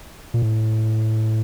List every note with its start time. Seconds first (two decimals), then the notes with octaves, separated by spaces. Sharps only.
0.34 A#2
0.42 A2